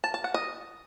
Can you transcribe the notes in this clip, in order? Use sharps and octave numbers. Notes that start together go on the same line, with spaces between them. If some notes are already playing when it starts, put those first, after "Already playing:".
A5
A5
F#5
D#5